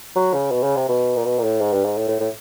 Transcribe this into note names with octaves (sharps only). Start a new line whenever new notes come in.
F#3
C#3
B2
C#3
C3
B2
A#2
B2
A#2
A2
G#2
G2
G#2
A2
A2
A2